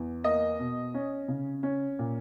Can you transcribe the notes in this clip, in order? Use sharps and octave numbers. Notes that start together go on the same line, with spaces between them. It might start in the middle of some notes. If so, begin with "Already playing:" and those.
Already playing: E2
A#3 D#5
B2
C#4
C#3
C#4
A#2